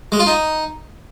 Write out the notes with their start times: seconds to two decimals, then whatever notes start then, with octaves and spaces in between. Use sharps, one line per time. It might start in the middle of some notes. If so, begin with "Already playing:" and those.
0.12 G#3
0.19 F4
0.26 D#4